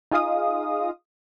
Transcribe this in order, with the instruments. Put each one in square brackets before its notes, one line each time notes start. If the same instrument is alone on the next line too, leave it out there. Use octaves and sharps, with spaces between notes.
[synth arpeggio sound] D#4 F4 G#4 D#5 F5 D#6